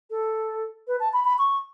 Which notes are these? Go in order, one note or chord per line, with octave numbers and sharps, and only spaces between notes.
A4
B4
A5
B5
B5
C#6